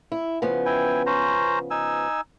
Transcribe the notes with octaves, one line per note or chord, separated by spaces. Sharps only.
E4
C#3 F3 B3
E4 G5 G#5
C#4 C5 A#5
D#4 G#5 E6